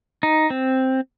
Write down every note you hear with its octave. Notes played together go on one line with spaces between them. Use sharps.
D#4
C4